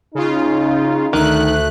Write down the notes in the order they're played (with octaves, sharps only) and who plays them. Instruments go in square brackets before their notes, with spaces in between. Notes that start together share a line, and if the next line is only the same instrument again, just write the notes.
[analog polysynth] C#3 F4 [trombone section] D#4
[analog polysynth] D2 F#6 [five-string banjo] D#3 [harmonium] A3